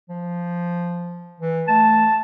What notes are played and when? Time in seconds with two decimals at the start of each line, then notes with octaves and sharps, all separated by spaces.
0.10 F3
1.40 E3
1.68 A3 A5